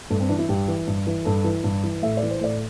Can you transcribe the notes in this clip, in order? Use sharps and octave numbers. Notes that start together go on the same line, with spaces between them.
G2 A3
C4
E3 D4
E4
G2 G4
E3
G2
E3
G2 A4
E3
G2
E3
A2 E5
D5
E3
C5
A2 D5